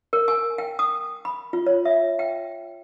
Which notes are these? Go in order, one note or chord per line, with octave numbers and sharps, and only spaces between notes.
A#4
G#5
G5
D#6
B5
F4
C#5
E5
G5